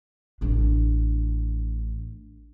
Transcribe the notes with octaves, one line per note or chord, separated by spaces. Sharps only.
A1 D4